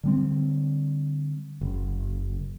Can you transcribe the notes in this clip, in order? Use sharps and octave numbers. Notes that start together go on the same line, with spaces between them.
D3 G3 C4
F#1